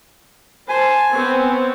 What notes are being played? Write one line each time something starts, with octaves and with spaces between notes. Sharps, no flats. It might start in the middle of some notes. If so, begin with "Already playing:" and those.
C5 G#5 A5
B3 C4 C#5